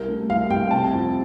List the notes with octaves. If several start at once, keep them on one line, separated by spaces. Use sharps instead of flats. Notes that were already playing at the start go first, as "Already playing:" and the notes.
Already playing: C2 A#4
A3
C2 F5
C2 G5
C3 A5
F2